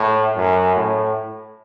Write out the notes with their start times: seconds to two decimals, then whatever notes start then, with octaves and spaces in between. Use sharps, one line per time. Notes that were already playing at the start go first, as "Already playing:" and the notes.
Already playing: A2
0.36 F#2
0.76 A2